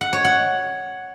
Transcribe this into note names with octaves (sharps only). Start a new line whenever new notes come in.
F#5
C#5
F#5